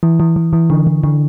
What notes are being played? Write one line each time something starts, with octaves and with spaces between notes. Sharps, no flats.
E3
E3
E3
E3
D3
D3
D3